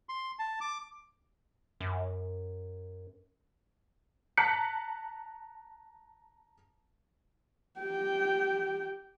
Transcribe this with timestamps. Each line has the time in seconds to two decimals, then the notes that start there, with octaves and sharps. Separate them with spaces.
0.09 C6
0.39 A5
0.61 D6
1.80 F#2
4.37 A5 A#5 F#6 B6 C#7
7.80 G4 G5